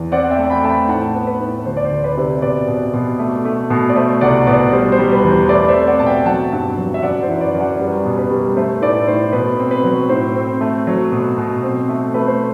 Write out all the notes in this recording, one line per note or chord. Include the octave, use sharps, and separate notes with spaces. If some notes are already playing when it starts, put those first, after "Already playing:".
Already playing: E2
C4 D5 F#5
F#5
E5 G5
A3
G5 B5
A3 A5
G5 B5
A2 F#5 A5
B3
B4
A2
D2 C5
D5
C5
D2
B4 D5
C3
B2 B4 D5
B2
B2
A3
A3
B2
D5
A3 C5
C2 D5 F#5
B2 B4 D5
G3 C5
C5
G3
B4
E2
C5
A3 B4 D5
D5
C5 E5
C4
D5 F#5
B2 A5
E5 G5
F#3 F#5 A5
G2
F#3
E5
F#2 D5 F#5
C5
E3
B4 D5
F#2
D5 F#5
G3 B4 D5
B2
B4
G3
A3 C5
A2 B4 D5
A2 C5
B2 B4
C4
B4
F#3
A2 C5
C4
A3
F#3
B2
B2
C4
A3
A3 B4
C5